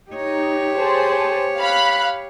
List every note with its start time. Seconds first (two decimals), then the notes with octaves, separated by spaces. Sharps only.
0.11 D#4 G4 C#5
0.75 G#4 C5 A5
1.59 F5 B5 F#6